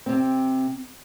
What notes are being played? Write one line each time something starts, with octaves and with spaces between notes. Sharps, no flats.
C3 C4